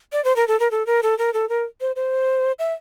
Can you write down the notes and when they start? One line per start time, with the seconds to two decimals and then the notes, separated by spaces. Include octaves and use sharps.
0.13 D5
0.24 C5
0.36 A#4
0.48 A4
0.60 A#4
0.71 A4
0.86 A#4
1.03 A4
1.18 A#4
1.34 A4
1.49 A#4
1.81 C5
1.96 C5
2.59 E5